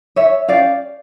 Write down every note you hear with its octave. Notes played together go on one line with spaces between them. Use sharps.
C#5 E5
C#4 G4 D5 F5